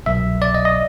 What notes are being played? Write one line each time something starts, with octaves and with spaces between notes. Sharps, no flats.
C2 B2 F#3 E5
D5
D#5
D#5